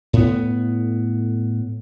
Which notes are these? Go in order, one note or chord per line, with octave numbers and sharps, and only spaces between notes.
A2 B3